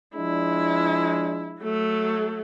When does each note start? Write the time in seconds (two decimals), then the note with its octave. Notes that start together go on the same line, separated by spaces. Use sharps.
0.16 F3 G#3 D4 E4
1.62 F#3 A3